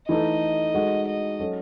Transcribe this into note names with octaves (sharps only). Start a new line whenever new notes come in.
E3 A3 D#4 A4 D#5
G#3 D#4 F#4 A4
D#5
F#3 C#4 F#4 A4